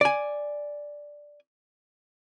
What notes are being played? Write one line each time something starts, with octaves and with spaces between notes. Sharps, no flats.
D5 G#5